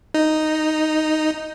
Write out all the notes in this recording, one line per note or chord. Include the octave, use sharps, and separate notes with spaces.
D#4